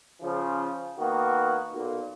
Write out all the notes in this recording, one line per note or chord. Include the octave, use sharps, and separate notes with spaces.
C#3 F3
D#3 A#3 B3 F#4
B1 A#2